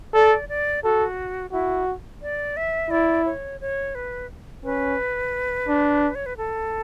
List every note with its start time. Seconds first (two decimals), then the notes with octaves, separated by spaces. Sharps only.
0.14 A4 D5
0.49 D5
0.84 F#4 A4
1.52 E4 F#4
2.22 D5
2.57 E5
2.91 E4 D5
3.25 C#5
3.61 C#5
3.95 B4
4.64 C#4 B4
5.68 D4
6.15 C#5
6.26 B4
6.37 A4